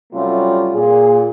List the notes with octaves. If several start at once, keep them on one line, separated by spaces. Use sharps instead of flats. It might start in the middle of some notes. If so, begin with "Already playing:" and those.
C3 F#3 G3 A3 C#4 F4
A#2 G#4